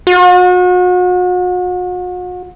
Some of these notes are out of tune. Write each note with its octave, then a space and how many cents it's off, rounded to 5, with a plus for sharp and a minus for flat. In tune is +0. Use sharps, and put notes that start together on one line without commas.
F#4 -40